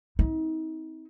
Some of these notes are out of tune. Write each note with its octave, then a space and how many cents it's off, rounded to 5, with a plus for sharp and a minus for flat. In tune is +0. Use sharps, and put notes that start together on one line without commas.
C4 -10 D#4 +40